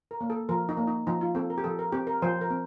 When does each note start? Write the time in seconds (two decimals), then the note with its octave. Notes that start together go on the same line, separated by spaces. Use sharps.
0.11 A#4
0.21 A#3
0.30 A4
0.49 F3 A#4
0.69 D#4
0.77 A#3
0.87 D#4
1.07 F3 D#4
1.21 F4
1.35 C4 A4
1.50 A#4
1.58 G4
1.64 F3 A4
1.79 A#4
1.92 C4 G4
2.07 A#4
2.22 F3 C5
2.41 A#4
2.50 C4